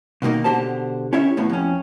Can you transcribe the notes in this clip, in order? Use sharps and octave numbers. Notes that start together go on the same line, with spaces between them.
B2 D#3 F#3 A#3 D#4
B2 D3 G4 C5 A5
C#4 E4 G4 C#5 E5
D#2 A2 B3
F2 C#4